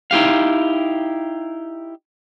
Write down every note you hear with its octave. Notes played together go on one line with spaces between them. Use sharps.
D#4 E4 G4 F5